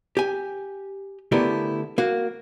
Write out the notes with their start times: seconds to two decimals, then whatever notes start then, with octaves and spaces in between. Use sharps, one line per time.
0.17 G4 G#5
1.32 D3 A3 B3 E4 G4 A#4
1.98 A#3 F#4